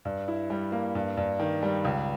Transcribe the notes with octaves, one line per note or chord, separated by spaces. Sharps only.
G2
E4
G3
A#3
G2
G2
D#3
G3
C#2